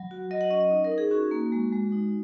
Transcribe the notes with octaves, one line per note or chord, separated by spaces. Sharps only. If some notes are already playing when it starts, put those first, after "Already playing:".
Already playing: F#3
F#4
F#3 D#5
F#5
C#4 D#5
D#5
D#4
A#4
D#4
G#4
C#4 F#4
A#3
G#3
G#3
D#4